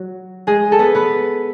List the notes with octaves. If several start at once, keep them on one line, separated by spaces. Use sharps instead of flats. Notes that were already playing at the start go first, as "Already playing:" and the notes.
Already playing: F#3 F#4
G#3 G#4
A4
B3 B4
B3 B4